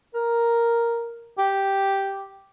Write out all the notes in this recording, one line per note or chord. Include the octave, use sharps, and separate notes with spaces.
A#4
G4